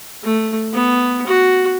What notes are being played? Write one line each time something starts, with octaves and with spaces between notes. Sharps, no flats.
A3
B3
F#4